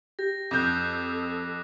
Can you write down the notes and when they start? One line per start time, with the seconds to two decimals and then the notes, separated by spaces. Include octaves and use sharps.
0.19 G4 A#6
0.51 F2 A4 D6 D#6 F#6 G6